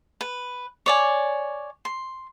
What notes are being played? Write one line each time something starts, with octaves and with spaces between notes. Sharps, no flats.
B4
C#5 D5 G#5
C6